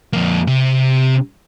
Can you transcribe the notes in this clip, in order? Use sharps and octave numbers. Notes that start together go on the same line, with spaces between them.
F2 A#3
C3